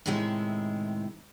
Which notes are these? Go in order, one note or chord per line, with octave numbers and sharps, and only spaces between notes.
A2 C3 D#3 G#3 E4